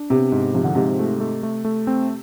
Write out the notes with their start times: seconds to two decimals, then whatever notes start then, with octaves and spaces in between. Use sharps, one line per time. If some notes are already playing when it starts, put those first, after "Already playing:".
Already playing: D4
0.10 C3 B3
0.32 G#2
0.54 C3 F3
0.64 D3
0.75 G#2 C3
0.99 A3
1.20 A3
1.43 A3
1.65 A3
1.87 C4